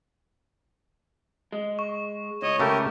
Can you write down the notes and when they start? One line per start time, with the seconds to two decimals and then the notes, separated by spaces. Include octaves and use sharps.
1.52 G#3
1.79 C#6
2.42 C#2 C#5 D#5
2.60 C#3 A3 G4 A#4